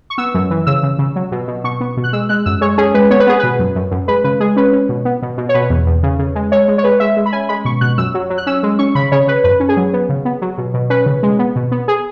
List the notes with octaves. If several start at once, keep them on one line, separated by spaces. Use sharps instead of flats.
C#6
B3 E6
F#2
E3
C#3 E6
C#3
C#3
F#3
B2
B2
B2 C#6
B3
B2
F#6
G#3 E6
G#3 F#6
F#2 E6
G#3 C#5
C#4 G#4
G#3 B4
B3 C#5
B4
B3 G#4
B2 B4
F#2
F#2
F#2
G#3 B4
C#3 B4
G#3 G#4
C#4 B4
C#4
B2
B3
B2
B2
C#5
B2 B4
E2
E2
C#3
C#3
G#3
G#3 C#5
G#3
C#5
G#3 B4
G#3 E5
G#3
B5
C#4 G#5
G#3 B5
B2 C#6
B2 F#6
F#2 E6
F#3
F#3
F#6
C#4 E6
G#3
C#4 C#6
C#3 B5
C#3 C#5
C#3 B4
F#2 B4
C#4
G#4
F#3
B3
C#3
B3
F#3
B2
B2
C#4 B4
C#3
G#3
B3
B2
B3
G#4